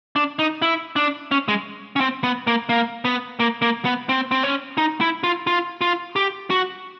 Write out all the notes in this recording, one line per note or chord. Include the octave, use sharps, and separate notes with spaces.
D4
D#4
E4
D4
C#4
G#3
C#4
C4
B3
A#3
A#3
B3
A#3
A#3
B3
C4
C4
C#4
D#4
E4
F4
F4
F4
G4
F#4